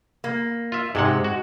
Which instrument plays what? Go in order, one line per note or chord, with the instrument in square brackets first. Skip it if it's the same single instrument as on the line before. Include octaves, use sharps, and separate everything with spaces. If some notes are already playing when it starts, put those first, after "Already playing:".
[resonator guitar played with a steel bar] A#3
[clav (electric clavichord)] F4 E5
[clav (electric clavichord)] G#2 C3 F#5 [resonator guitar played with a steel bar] G#3
[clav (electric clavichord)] F#4